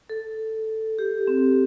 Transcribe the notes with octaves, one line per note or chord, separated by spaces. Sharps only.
A4
G4
C4